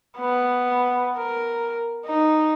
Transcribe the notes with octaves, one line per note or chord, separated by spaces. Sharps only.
B3
A#4
D#4